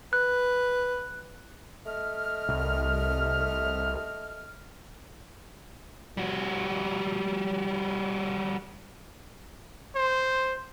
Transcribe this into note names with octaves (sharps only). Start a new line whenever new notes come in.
B4 F#6
A3 D#5 F6
C2
G3 F#4
C5